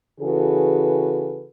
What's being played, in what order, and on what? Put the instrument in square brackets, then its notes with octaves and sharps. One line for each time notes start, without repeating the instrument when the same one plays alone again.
[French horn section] C#3 E3 F#4 G#4 A4 B4